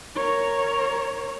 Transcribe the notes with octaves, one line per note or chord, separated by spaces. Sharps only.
A#4 C#5